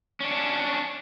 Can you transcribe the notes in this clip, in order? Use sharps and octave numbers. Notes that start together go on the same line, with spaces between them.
C#4 D4